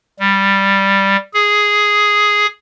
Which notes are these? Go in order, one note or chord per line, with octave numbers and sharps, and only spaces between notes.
G3
G#4